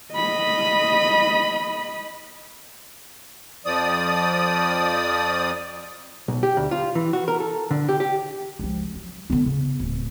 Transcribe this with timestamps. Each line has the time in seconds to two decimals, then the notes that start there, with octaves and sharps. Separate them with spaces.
0.14 D#5 B5
3.66 F2 F3 D5 D#6
6.28 B1
6.43 G4
6.57 D2
6.71 F4
6.95 E3
7.13 F#4
7.28 A#4
7.40 A4
7.71 D3
7.89 G4
8.00 G4
8.59 C#2 F3
8.95 F#3
9.30 D3 B3
9.46 C#3
9.80 D1